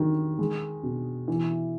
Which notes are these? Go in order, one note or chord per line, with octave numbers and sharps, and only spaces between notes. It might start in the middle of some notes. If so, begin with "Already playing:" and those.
Already playing: D#3 F#3
G#3
B2
E3